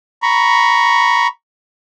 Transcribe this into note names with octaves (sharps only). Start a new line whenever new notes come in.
A#5 B5 C#6